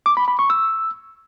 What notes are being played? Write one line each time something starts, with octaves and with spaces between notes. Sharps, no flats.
D6
B5
B5
C#6
E6